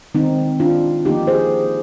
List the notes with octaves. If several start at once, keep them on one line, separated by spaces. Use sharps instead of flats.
D#3 G#3 C4 D#4
D4 F4
D3 F3 A#3 D#4 G4
G#4 C5